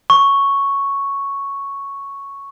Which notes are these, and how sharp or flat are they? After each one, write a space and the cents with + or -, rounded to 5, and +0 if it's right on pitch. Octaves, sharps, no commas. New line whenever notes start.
C#6 +0